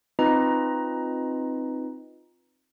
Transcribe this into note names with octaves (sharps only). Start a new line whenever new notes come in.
C4 D#4 F4 B4 D#5 A#5